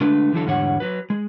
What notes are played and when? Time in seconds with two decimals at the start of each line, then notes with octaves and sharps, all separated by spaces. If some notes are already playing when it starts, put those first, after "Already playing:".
0.01 D3 G#3 A3 D4 B4
0.33 D3 E3 F#3 A4
0.45 E2 G#2 D3 G3 C#5 F#5
0.80 F#3 B4
1.10 G#3